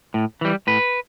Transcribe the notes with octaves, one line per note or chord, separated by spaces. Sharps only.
A2
E3 G3
A2 B4